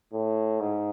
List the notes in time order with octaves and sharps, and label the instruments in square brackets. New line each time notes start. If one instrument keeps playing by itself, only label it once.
[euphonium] A2
G#2